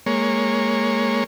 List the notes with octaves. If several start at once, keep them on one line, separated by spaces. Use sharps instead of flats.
G#3 A#3 C#5